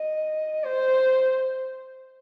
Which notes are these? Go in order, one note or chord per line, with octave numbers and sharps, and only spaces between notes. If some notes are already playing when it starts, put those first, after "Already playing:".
Already playing: D#5
C5